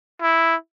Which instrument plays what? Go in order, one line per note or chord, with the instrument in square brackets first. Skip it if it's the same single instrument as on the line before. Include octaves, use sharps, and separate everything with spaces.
[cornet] E4